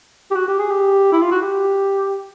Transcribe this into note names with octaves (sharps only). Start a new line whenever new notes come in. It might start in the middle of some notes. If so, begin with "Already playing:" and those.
G4
F#4
G4
G#4
G4
E4
F4
F#4
G4